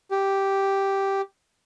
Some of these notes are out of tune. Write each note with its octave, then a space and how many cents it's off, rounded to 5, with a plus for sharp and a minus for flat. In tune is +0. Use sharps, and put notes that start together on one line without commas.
G4 -5